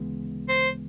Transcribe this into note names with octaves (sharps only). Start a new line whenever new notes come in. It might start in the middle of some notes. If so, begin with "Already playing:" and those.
Already playing: D2 C#3 E3 G#3 B3
C5